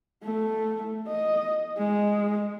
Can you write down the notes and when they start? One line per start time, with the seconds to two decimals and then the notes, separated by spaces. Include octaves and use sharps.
0.23 A3
1.08 D#5
1.78 G#3